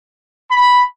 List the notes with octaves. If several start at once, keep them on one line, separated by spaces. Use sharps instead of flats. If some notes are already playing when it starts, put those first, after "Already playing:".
B5